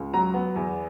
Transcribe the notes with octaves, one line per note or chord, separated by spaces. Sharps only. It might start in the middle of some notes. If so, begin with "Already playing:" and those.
Already playing: C#2
F#3 A#5
B3
E2